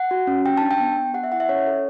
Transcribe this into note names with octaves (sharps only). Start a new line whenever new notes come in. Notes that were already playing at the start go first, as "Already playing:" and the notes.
Already playing: F#5
F#4
C#4
G4 G5
D4 A5
G5
B3
B3
G4 F#5
E5
E4 F#5
E5
C#4 C#5
A4